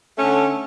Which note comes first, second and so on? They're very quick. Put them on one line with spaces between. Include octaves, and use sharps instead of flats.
A3 C#4 D3